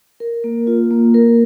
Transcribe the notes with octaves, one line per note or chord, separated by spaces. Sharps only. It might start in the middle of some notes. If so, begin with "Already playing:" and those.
A#4
A#3
F4
A#3
A#4